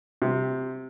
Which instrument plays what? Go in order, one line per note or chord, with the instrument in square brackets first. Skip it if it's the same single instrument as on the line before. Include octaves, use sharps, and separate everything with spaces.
[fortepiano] C3